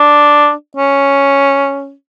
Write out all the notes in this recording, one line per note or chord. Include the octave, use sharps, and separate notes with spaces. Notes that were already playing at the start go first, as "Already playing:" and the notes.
Already playing: D4
C#4